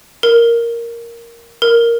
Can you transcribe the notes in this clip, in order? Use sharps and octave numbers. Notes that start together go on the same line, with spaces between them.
A#4
A#4